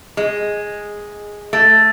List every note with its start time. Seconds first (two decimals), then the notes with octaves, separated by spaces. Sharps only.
0.17 G#3
1.53 A3